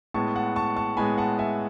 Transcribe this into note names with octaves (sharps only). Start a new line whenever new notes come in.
A2 G#3 B3 A5 C#6
F#5 A5
A5 C#6
A5 C#6
A2 G#3 B3 G#5 B5
F#5 A5
E5 G#5